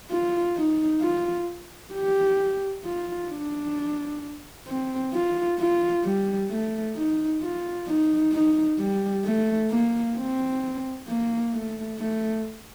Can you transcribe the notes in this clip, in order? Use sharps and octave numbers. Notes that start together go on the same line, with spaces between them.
F4
D#4
F4
G4
F4
D4
C4
F4
F4
G3
A3
D#4
F4
D#4
D#4
G3
A3
A#3
C4
A#3
A3
A3